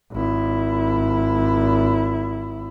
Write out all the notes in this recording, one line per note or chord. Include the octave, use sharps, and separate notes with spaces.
G#1 E4